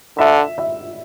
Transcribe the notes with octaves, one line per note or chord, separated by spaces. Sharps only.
D3 E5
E5